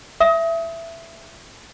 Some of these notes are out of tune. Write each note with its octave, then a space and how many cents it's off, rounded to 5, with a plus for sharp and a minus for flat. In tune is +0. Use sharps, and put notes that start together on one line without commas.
E5 +15 D#6 +30